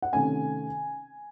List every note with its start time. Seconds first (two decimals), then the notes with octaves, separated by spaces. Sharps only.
0.02 F#5
0.13 C3 D#3 A3 C#4 G#5